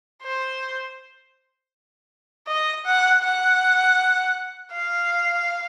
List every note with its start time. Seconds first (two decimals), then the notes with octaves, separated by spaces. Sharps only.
0.23 C5
2.47 D#5
2.86 F#5
3.23 F#5
4.72 F5